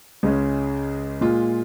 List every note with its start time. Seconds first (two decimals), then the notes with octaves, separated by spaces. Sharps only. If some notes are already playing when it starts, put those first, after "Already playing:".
0.23 C#2 C#3 G#3 C#4
1.21 A#2 G#3 F4